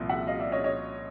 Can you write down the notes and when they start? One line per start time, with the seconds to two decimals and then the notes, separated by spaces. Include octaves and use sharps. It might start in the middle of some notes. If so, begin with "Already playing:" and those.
Already playing: C2 A#2 F3
0.09 E5 F#5
0.27 D#5 F5
0.40 D5 E5
0.52 C#5 D#5
0.64 C#5 D#5